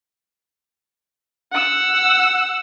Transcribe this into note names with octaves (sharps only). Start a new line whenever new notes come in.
F#5 E6